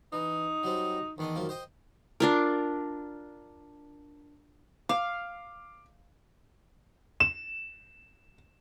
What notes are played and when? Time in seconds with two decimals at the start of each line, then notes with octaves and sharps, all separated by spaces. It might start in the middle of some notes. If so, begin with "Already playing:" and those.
0.13 E3 D#4
0.63 F#3 G3 C4
1.18 E2 D#3 D4 D#5
1.35 F#2 F3 A#3
1.49 C5 D#5 G5
2.20 D4 F4 A#4
4.89 F5 D6
7.20 E7